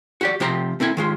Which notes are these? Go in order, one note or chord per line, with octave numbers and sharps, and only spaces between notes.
F#4 G4 D5
C3 F3 G4 G5 A#5
A3 C4 E4 G#5
D#3 G#3 F4